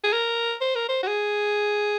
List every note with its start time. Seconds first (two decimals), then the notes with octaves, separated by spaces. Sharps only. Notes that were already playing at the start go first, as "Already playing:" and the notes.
0.04 G#4
0.13 A#4
0.61 C5
0.75 A#4
0.89 C5
1.03 F#4
1.07 G#4